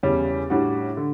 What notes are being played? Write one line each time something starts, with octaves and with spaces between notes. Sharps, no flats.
E2 C#3 G3 C#4
A2 G3 D4 F#4
D3